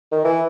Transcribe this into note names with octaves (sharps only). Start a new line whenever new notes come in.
D#3
E3